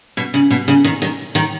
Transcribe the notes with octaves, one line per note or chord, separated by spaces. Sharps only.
B2
C#3
B2
C#3
D#3
D#3
D#3